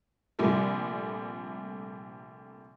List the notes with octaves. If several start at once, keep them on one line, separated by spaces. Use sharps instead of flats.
A#1 C3 F3 G3 A3